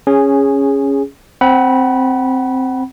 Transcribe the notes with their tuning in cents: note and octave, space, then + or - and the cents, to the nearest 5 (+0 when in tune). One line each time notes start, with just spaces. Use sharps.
C#4 +0 G#4 -10
C4 +0 F#5 +25 B5 -20